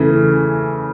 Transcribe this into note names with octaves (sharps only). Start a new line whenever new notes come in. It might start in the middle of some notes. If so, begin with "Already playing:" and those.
Already playing: C#3 E3 A3